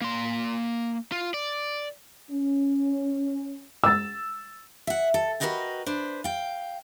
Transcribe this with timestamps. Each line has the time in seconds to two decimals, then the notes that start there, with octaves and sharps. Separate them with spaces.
0.02 A#3 C6
1.12 F4
1.34 D5
2.31 C#4
3.84 E6 A6
4.87 E5 F#5
5.14 A4
5.40 F#4 G#4 A#4 B4 D#5 G5
5.86 D4 B4 C5
6.24 F5 G5